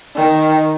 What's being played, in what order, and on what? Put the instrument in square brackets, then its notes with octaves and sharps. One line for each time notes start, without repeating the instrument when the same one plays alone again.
[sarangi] D#3